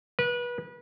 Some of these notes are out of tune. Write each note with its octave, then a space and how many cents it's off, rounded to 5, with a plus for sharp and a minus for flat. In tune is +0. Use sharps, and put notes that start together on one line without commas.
B4 -30